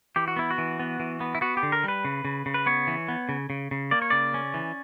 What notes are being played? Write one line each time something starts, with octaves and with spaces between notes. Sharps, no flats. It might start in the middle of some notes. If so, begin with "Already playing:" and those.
E3 G4
F#4
B3 E4
F#4
E3
B3
E3
B3
E4
B3 F#4
G4
D3
A#4
G3 B4
C#3
C#3
C#3
B4
B3 C#5
E3
B3
C#3
C#3
C#3
A#3 D5
C#5
C#3 D5
C#4
E3